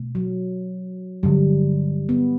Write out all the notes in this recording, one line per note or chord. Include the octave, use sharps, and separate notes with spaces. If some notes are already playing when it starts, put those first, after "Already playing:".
Already playing: B2 A3
F#3
G2 D3 F#3 G3
B3